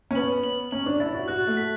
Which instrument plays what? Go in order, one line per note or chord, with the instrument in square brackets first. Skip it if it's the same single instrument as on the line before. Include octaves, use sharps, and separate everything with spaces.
[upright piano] C#4
[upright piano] B3 [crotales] F#7
[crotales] F#7
[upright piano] C#4 [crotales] F#7
[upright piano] D4
[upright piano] E4 [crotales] A6
[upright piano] F#4
[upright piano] F#4 [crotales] F#6
[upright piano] A3
[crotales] B6